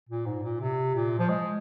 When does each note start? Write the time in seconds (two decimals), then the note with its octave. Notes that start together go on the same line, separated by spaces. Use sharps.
0.09 A#2
0.26 G#2
0.44 A#2
0.60 C3
0.95 A#2
1.19 F3
1.29 G#3